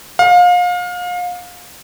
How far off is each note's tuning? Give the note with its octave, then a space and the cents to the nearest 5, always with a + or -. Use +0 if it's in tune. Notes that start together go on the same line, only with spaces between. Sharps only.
F5 +30